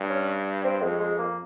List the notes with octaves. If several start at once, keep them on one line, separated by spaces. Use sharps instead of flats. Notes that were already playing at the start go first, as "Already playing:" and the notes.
Already playing: G2
C#4
C4
F2 G#3
G#3
A#3